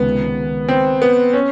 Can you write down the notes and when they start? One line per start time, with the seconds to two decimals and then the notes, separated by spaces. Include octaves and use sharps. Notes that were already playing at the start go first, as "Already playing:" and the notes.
Already playing: C#2 C3 D#3 B3
0.68 C4
1.02 B3
1.33 C#4